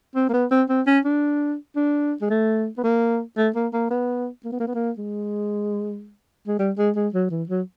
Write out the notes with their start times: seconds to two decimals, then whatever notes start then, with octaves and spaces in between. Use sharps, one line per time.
0.15 C4
0.29 A#3
0.33 B3
0.51 C4
0.69 C4
0.87 C#4
1.05 D4
1.76 D4
2.22 G#3
2.30 A3
2.77 B3
2.84 A#3
3.37 A3
3.55 A#3
3.73 A#3
3.90 B3
4.45 A#3
4.52 B3
4.60 A#3
4.67 B3
4.75 A#3
4.98 G#3
6.48 G#3
6.59 G3
6.78 G#3
6.96 G#3
7.14 F#3
7.31 E3
7.49 F#3